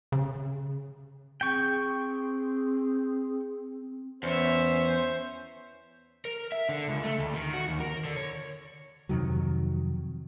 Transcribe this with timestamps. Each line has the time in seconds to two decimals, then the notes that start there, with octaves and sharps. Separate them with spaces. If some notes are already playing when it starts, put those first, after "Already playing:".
0.12 C#3
1.41 C4 G#4 G5 C#6
4.23 E2 C#4 C5 E5
6.25 A#4
6.52 E5
6.69 D3
6.88 C#2
7.04 A3
7.18 D2
7.34 D#3
7.53 F#4
7.68 D#2
7.80 A#4
8.04 D3
8.16 C#5
9.09 F2 C3 D#3 F#3